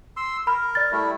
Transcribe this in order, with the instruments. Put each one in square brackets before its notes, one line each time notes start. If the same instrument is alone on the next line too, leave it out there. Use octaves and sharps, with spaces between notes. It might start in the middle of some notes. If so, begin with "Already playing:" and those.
[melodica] C6 E6
[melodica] A#4 [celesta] B5
[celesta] D5 A6
[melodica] G3 A3 E4